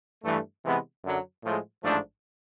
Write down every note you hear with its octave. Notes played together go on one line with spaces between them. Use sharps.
G2 E3 A3
C3 E3 G#3 B3
F#2 D3 F#3
A2 F3 G#3
A1 G#2 F3 A3 D4